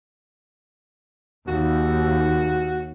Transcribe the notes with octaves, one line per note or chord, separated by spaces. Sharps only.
D#2 F#4